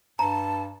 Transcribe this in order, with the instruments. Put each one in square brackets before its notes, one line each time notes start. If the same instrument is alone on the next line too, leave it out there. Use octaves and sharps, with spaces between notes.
[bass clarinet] G2 [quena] A5 [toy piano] A#5